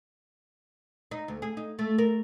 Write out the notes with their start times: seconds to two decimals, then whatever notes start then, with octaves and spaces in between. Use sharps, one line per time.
1.11 D#4
1.28 D2
1.42 G#4
1.57 D#4
1.79 A3
1.98 A#4